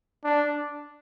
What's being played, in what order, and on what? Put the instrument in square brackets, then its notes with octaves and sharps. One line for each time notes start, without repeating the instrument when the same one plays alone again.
[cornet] D4